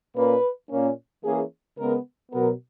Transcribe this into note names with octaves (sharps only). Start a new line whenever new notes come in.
A#2 A#3 C#4 B4
A#2 A#3 C#4
E3 A#3 C#4 G#4
C#3 G#3 B3 A#4
B2 F#3 B3 A#4